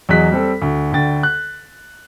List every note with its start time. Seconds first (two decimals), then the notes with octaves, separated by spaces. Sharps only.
0.09 E2 F#3 G#4 D#5 F#6 B6
0.31 G3 C4 A4
0.62 D2
0.92 D2 D3 G5 A6
1.23 F#6